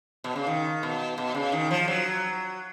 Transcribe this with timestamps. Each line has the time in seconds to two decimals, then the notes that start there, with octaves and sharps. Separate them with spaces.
0.24 B2
0.36 C#3
0.47 D#3
0.83 B2
1.18 B2
1.35 C#3
1.52 D#3
1.71 F3
1.88 F#3